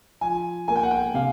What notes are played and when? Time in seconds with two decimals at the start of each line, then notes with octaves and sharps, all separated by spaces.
0.21 F3 G#5
0.68 A#3 G#5
0.76 G5
0.83 F#5
0.91 G5
1.14 C3 F5